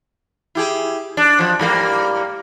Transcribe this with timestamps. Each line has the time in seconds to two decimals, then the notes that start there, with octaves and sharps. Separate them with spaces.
0.55 E4 G4 G#4
1.17 D4
1.39 F2 F3
1.60 G#2 G3 A#3